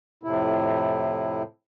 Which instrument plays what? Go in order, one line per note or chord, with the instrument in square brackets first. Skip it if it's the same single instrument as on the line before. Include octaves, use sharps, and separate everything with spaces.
[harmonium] F2 A2 C3 E4